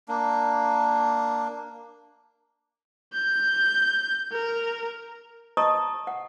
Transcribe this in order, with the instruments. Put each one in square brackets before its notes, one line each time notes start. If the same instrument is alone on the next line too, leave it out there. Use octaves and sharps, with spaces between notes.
[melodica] A#3 D4
[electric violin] G6
A#4
[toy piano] D#5 A5 A#5 C#6 D#6
F#5